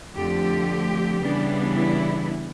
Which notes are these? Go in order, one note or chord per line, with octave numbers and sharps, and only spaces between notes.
F2 D3 F3 A3 G4
C#3 E3 G3 B3 D4
E4